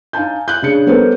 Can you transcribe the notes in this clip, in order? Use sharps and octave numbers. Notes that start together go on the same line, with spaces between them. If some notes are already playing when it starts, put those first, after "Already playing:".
D#4 F5 G#5 A5 G6
F#6 G6
C#3 D4 G#4 C#7
G3 B3 C#4 A4 A#4 C5